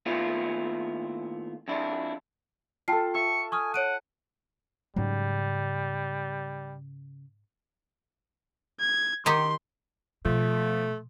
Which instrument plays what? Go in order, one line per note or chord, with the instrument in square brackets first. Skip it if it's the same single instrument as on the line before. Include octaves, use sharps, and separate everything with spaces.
[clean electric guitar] D#2 A2 B3 E4 F4
F2 D4 E4
[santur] F4 A4 [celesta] G5 A5 C7
[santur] E5 [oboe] C#6
[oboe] G#5 [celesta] C#6 D#6 F6
[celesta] C#5 D7 D#7 [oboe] F#5
[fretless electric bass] G#2 F#3 [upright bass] C#3 [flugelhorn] G3
[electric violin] G#6
[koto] D#3 D#4 G4 [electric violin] C6
[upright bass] B2 [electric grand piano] F3 [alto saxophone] A3